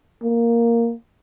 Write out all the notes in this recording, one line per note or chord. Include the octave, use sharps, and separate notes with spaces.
A#3